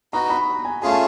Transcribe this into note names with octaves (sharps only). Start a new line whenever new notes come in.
D#4 F#4 B4 A#5
B5
G#5
A3 C#4 F4 G#4 G#5
A5